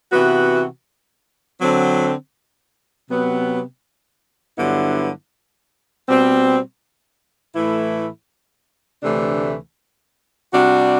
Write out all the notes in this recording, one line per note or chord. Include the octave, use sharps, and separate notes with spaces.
C3 E3 B3 F#4
D3 F#3 C4
C3 F#3 B3
G2 D3 F#3 B3 E4
B2 G3 C4
A2 E3 A3 E4
D2 C3 E3 A3 D4
C3 G3 D4 F#4